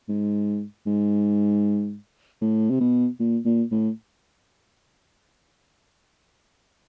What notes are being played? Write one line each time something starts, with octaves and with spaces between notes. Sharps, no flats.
G#2
G#2
A2
C3
B2
A#2
A#2
A2